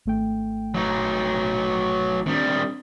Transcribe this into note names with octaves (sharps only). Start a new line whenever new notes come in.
G#1 A3 G5
F#3 D#4
D#3 G3 C4 D4